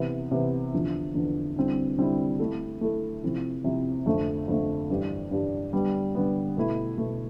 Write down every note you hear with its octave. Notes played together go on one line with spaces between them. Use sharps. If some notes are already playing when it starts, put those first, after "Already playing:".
Already playing: C3 E3 B3
C3 E3 B3
E2 D3 F3
E2 D3 F3
D3 G3 C4 E4
D3 G3 C4 E4
A3 E4 A4
A3 E4 A4
C3 F3 C4 E4
C3 F3 C4 E4
F2 D3 A3
F2 D3 A3
G2 E3 G3 D4 G4
G2 E3 G3 D4 G4
D3 G3 B3
D3 G3 B3
B2 A3 E4
B2 A3 E4